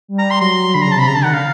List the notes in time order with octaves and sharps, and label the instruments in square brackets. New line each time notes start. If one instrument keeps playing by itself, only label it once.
[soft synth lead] G3
[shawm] A#5
C6
[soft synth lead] F#3 [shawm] C6
[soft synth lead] D3 [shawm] B5
[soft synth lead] C#3 [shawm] A#5
[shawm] A5
[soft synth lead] C3 [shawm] B5
[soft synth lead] C#3 [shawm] A#5
[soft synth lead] D3 [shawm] A5
[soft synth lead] D#3 [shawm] F#5
[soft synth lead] D3 [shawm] F5